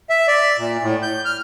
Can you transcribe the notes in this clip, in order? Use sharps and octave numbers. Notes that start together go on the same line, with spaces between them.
E5
D5
A#2
A2
G6
F6